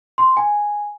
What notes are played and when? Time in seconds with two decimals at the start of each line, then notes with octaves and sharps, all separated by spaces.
0.18 C6
0.37 G#5